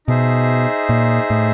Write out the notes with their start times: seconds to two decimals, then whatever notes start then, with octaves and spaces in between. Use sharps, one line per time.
0.07 B2 D#4 G#4 C5 E5
0.89 A#2
1.30 A2